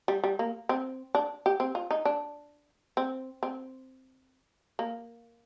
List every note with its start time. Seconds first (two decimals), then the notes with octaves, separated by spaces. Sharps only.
0.08 G3
0.23 G3
0.39 A#3
0.69 C4
1.15 D4
1.46 G4
1.60 C4
1.75 F4
1.91 D#4
2.05 D4
2.97 C4
3.43 C4
4.79 A#3